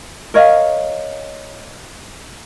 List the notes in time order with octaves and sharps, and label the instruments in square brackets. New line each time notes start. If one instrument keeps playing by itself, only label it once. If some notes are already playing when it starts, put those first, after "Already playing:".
[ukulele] A#4 C#5 D#5 F5